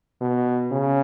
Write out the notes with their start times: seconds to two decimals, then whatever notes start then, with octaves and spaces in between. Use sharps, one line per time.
0.21 B2
0.72 C#3